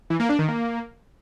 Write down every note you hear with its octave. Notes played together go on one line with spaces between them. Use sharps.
E3
A#3
D4
D#3
A#3